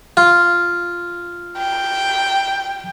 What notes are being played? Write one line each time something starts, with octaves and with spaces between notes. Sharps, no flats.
F4
G5